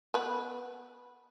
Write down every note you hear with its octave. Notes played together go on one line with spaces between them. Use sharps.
B3 B4